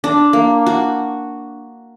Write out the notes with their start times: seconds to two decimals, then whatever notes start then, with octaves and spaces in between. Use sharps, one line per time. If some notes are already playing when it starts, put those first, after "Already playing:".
0.04 D4
0.33 A#3
0.66 F#4